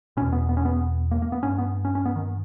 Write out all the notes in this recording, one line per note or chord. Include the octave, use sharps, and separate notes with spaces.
E2 B2 C#4
B3
B3
C#4
B3
A#3
A#3
B3
G2 C#4
B3
C#4
C#4
B3
D#3